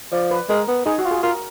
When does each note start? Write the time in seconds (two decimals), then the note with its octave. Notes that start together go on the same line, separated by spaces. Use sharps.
0.12 F3 D5
0.31 B4
0.49 G#3 A#4
0.68 B3
0.86 D#4 G#4
0.99 F#4
1.05 F4
1.11 G#4
1.23 F4 A#4